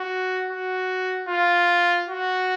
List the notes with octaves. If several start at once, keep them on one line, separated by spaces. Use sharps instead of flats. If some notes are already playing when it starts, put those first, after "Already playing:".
Already playing: F#4
F#4
F4
F#4